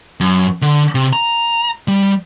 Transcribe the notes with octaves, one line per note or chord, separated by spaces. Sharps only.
F#2
D3
C3
A#5
G3